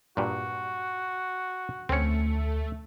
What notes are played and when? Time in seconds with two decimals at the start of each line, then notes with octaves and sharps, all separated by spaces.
0.17 G2 A#2 F#4
1.89 D2 A3 C4 C#4 C#7